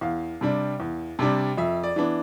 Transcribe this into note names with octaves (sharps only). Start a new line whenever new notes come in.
E2 F5
C3 G3 D4
E2
C3 G3 D4
F2 E5
D5
E3 B3 D4